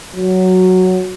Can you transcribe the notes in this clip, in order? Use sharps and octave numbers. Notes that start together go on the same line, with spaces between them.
F#3